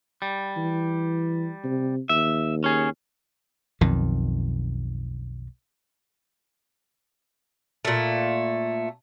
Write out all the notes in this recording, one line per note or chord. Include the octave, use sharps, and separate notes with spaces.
G3
E3
C3
D#2 E5
C#4 G#4
B1 F2 D#3
A#2 A3